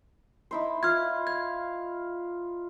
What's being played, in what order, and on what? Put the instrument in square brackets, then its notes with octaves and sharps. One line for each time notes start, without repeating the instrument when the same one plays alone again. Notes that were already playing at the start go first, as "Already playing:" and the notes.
[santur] D#4 E4 C5
[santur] F4 B4 F5 [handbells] F6 G#6
[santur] F5 [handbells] G#6